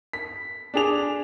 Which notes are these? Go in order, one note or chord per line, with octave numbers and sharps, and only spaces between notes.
B6
D4 G#4 F7